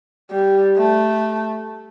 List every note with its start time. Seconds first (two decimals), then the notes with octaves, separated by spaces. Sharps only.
0.30 G3
0.77 A3